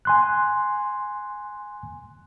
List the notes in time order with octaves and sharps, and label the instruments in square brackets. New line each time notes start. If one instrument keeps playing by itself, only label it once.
[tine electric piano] G#5 C6 F#6